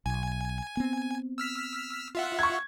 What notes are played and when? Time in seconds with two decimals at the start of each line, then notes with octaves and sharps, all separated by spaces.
0.06 B1 G#5
0.77 B3 C4
1.38 E6 F6 B6
2.15 F4 E5 F#5
2.39 C#6 G#6